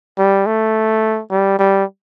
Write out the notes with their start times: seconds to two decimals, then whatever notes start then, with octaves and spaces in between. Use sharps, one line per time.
0.18 G3
0.46 A3
1.31 G3
1.59 G3